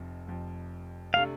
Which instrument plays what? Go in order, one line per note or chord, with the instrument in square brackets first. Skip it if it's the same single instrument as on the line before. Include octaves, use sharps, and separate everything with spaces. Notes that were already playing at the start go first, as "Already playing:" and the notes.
Already playing: [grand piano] F1 F2 F3
F1 F2 F3
[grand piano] C3 A3 D4 [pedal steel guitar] F5